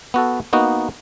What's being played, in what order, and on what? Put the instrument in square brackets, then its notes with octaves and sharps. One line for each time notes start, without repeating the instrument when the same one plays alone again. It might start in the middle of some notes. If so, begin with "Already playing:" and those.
[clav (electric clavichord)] B3 F#4 A4
A#3 B3 D#4 F#4